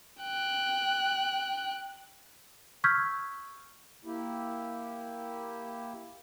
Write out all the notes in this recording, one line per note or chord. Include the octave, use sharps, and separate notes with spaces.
G5 F#6
C#6 E6 F6 G6 G#6 B6
A#3 E4 G4